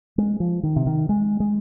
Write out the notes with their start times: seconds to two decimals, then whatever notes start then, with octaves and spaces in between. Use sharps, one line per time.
0.18 G#3
0.40 F3
0.63 D#3
0.76 C3
0.86 D#3
1.09 G#3
1.40 G#3